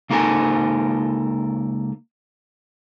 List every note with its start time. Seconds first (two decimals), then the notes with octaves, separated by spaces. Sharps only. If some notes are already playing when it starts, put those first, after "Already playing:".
0.10 C#2 A#3 D#4 A4 A#4 G#5